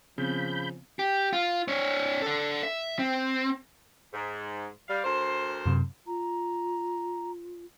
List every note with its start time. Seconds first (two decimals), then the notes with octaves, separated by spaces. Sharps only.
0.18 C#3 F3 B3 C4 B5 G6
0.99 G4
1.33 F4
1.68 D4 C#5
2.22 D4 A4
2.63 E5
2.99 C4
4.14 G#2
4.89 G3 F5
5.04 D2 A#4 C5
5.66 F#2 C3
6.07 F4 A#5